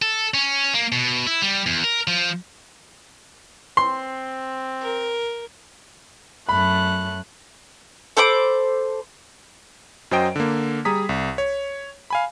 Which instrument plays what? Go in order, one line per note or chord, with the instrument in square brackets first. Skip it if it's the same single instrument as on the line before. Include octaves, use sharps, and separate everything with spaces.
[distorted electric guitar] A4
C#4
A#3
B2
E4
G3
E2
A#4
F3
[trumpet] C4 [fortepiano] C6
[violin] A#4
[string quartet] F#2 A3 F#6 [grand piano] B5
[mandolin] A4 C5 B5 D6
[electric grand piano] F#2 F#3 C5 D#5 G5 D7
D3 A#3
G3 G#4 A#5 D#6 B6
C2
C#5
F5 G#5 B5